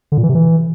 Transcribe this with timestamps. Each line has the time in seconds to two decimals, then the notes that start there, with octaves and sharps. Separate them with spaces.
0.12 D3
0.18 A#2
0.23 E3
0.29 C3
0.35 E3